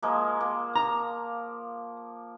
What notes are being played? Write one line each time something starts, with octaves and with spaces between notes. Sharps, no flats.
F3 G#3 A#3
A#3
A#5